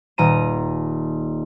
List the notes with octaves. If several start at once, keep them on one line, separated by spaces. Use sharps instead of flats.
D#1 A#5 D#7